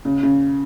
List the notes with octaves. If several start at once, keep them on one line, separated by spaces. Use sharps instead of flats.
C#3
C#3